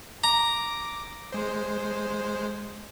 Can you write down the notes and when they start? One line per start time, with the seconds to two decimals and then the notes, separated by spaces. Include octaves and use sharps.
0.24 A#5 D6
1.32 G#3 C5